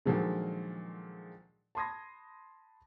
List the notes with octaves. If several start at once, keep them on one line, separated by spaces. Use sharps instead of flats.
A#2 D3 D#3 F3 F#3 G#3
A5 B5 C6 D#6 G#6 A#6